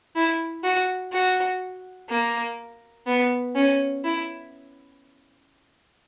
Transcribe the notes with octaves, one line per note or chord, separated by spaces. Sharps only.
E4
F#4
F#4
A#3
B3
C#4
E4